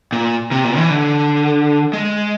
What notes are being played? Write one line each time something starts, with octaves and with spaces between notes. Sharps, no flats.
A#2
C3
A#2
E3
D3
G#3